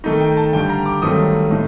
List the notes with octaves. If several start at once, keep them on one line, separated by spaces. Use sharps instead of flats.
D#3 A3 D#4 D#5
G5
A5
G2 D3 G3 G5
A#5
D6
G2 D#3 F#3 A3 C4 D#6
A2 A3 D#4